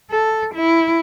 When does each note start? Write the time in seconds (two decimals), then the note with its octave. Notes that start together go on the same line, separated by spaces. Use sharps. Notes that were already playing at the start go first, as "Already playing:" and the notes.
0.11 A4
0.55 E4